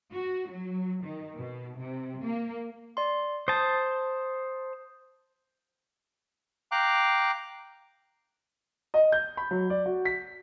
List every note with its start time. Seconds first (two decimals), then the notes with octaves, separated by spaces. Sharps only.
0.12 F#4
0.48 F#3
1.03 D#3
1.38 B2
1.79 C3
2.24 A#3
2.97 D5 C6
3.48 C5 A5 D#6 G6
6.72 F5 G5 A#5 D6 F#6
8.94 D#5
9.12 G6
9.37 B5
9.51 F#3
9.70 D5
9.86 F#4
10.05 B6